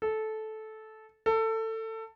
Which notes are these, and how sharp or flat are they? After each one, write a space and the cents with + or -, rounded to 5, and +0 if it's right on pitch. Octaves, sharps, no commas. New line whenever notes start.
A4 -15
A4 +20